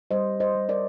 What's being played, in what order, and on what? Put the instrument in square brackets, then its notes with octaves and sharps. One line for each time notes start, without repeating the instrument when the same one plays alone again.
[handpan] G3 C5 D#5
C5 D#5
G3
A#4 D5